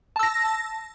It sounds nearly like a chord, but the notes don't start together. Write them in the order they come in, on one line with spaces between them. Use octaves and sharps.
A5 E6 A#6